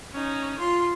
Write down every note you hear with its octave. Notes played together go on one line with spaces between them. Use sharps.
C#4 D#4
F4 C6